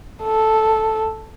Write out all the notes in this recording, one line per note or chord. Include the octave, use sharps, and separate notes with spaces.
A4